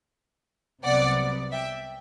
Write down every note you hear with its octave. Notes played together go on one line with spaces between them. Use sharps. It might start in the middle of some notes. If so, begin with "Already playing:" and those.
C2 C3 F#3 B3 D5 F#5
E5 G5